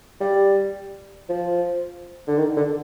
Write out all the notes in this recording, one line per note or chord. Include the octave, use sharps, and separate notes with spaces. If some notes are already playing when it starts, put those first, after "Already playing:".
G3
F3
D3
D#3
D3